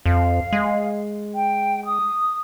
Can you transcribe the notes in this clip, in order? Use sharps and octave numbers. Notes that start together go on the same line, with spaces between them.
F2 F5
G#3
G5
D#6